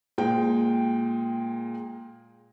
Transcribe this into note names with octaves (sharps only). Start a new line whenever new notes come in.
A#2 G#3 G5